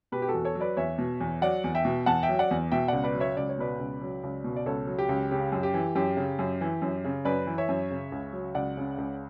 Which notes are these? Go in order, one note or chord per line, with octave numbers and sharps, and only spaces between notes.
B2 G4 B4
G4
F#4 A4
E2
A4 C#5
F#3
B4 D5
E2 C#5 E5
B2
E2
F#3 D5 F#5
E2
E5 G5
B2
E2 F#5 A5
E5 G5
F#3
D5 F#5
E2
B2 E5 G5
C#2 D5 F#5
B4 D5
F#3
C#5 E5
C#2 D5
C#5
B2 B4 D5
C#2
F#3
C#2
B2
D5
C#2 A4 C#5
F#3
G4
C#2
C#3 G4
F#2
G4
E3
F#2 G4
C#3
F#2
E3
F#2
C#3
F#2 B4 D5
E3
C#5 E5
F#2
C#3
C#2
F#3
C#2 D5 F#5
C#3
C#2